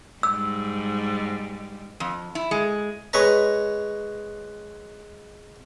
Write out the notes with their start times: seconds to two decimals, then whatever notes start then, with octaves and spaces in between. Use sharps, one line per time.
0.23 G#2 G3 E6
2.00 F2
2.35 E4
2.51 G#3
3.13 G#3 B4 C#5 A#5